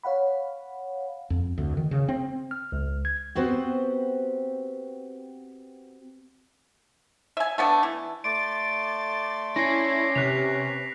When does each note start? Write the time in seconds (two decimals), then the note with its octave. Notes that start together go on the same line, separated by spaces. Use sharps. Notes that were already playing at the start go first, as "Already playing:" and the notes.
0.04 C#5 F5 F#5 B5
1.30 F2
1.58 D2
1.77 D#3
1.91 C#3
2.08 C4
2.51 F6
2.72 C#2
3.05 G#6
3.35 B3 C4 F#4 G4 B4 C5
7.37 E5 G#5
7.58 A3 B3 D4
7.83 E3
8.24 A3 D5 C6 A6 D7
9.56 C#4 E4 A#6 C7
10.15 C3 B4 F#6 B6 F7